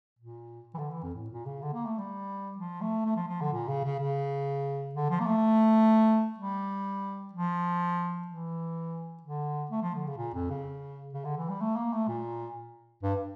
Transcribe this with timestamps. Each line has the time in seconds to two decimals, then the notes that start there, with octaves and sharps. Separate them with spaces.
0.19 A#2
0.75 E3
0.79 D3
0.91 E3
1.03 F2
1.15 A2
1.30 A#2
1.46 C#3
1.62 D3
1.73 A#3
1.86 A3
1.98 G3
2.58 F3
2.81 A3
3.05 A3
3.16 F3
3.28 F3
3.41 D3
3.53 A#2
3.68 C#3
3.84 C#3
3.99 C#3
4.95 D3
5.10 F3
5.20 A#3
5.26 A3
6.38 G3
7.33 F3
8.28 E3
9.23 D3
9.71 A3
9.82 F3
9.95 D3
10.07 C#3
10.18 A#2
10.34 F2
10.50 C#3
11.13 C#3
11.25 D3
11.37 E3
11.50 G3
11.61 A3
11.76 A#3
11.93 A3
12.08 A#2
13.03 G2